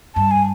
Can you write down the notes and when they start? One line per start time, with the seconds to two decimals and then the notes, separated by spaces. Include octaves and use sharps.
0.15 G2 A5
0.31 G#5